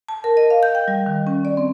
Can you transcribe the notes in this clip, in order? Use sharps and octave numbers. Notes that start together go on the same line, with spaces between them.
A5
A#4
D#5
F5
G6
G5
G3
D#3
C#4
D5
C4